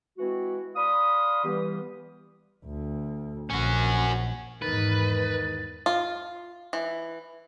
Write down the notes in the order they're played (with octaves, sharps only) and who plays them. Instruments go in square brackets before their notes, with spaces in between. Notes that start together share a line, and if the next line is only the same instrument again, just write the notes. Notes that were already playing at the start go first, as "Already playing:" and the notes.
[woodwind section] E3 G#3 C4 E4 F#4
D5 F5 B5 C6 D#6
E3 G3 B3 G4
[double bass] D2
[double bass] A#1 [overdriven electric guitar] C#4 F#4
[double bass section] E2 G#2 [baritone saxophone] D#3 [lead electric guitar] B4 [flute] A6
[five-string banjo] F4
E3